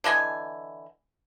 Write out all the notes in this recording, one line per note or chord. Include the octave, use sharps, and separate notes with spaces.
D3 E3 D#5 G#5